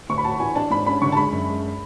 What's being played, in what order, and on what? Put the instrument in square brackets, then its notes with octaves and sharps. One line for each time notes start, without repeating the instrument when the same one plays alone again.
[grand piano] D2 [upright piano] C#6
[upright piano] B5
[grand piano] F#4 [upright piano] A5
[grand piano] E3 [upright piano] G#5
[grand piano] D4 [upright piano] A5
[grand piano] G#2 [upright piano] B5
[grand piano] C#4 [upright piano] B5
[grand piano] D3 [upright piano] C#6
[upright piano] A5
[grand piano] G#3 [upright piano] B5
[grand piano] F#2
G#3